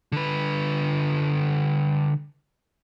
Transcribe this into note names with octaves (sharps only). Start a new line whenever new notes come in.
D3 B4